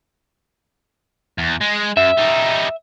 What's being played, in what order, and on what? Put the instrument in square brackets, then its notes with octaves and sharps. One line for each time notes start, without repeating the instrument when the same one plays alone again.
[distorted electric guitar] E2
G#3
[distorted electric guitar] F#2 [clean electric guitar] E5
[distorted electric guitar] G3 D#4